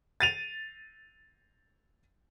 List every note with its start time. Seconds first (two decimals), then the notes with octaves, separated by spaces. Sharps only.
0.20 A6 D#7 F7